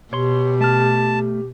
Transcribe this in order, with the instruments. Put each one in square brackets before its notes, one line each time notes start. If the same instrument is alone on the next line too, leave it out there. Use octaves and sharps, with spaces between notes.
[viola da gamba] B2 [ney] G4 [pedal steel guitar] C#5 C6
[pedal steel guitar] A3 F6 [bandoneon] A5